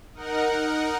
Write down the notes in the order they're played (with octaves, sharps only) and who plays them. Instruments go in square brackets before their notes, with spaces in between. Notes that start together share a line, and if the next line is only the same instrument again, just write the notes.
[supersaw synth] D#4 A#4 F#5